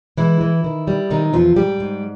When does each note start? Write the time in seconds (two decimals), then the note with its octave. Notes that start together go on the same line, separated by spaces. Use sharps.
0.17 E3 G#3 E4
0.41 E3
0.64 D#3
0.88 G3
1.10 C3 D#3 D#4
1.33 E2 F3 F4
1.56 G#2 G3 G4
1.80 G#2